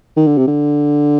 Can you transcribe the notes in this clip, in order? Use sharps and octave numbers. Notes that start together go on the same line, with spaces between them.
D#3
D3
C3
D3